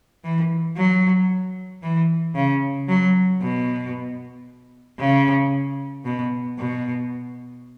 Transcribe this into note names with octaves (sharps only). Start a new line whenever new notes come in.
E3
F#3
E3
C#3
F#3
B2
C#3
B2
B2